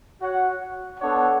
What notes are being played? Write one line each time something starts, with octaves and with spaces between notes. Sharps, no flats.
F#4 C#5 F#5
B3 D4 A4 C#5 F#5